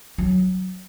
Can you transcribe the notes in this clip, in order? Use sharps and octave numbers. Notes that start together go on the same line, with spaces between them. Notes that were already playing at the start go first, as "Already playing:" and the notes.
F#3